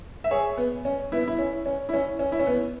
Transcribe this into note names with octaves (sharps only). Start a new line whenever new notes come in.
E5
G#4 C#5
B3
C#4
B3 E4
E4
C#4
C#4
E4
C#4
C#4
E4
C#4
B3